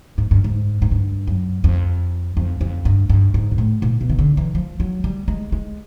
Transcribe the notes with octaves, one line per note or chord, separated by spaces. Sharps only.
G#2
G2
G#2
G#2
G2
F#2
F2
F2
F2
G2
G2
G#2
A#2
A2
A#2
B2
D#3
D3
E3
F3
F#3
G3
G#3
G#3